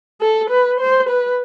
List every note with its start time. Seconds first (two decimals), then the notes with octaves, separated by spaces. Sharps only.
0.21 A4
0.50 B4
0.80 C5
1.09 B4